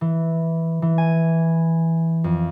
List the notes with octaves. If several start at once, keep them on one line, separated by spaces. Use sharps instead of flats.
E3
E3
G#5
F2